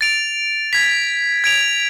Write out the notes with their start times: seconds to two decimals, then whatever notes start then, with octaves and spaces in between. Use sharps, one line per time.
0.01 A6 D7 F7
0.73 G#6 B6 F7
1.44 G#6 D7 F7